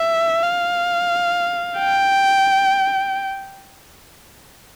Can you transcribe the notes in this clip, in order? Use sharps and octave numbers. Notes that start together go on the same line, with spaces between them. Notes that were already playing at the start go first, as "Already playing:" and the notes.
Already playing: E5
F5
G5